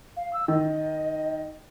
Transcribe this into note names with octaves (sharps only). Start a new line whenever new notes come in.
F5
E6
D#3 D#5